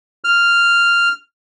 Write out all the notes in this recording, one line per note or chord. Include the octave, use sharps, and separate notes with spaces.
F6